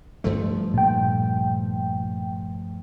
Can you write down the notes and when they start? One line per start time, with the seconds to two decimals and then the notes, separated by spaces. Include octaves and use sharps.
0.24 G2 F3 A3
0.74 A#2 G5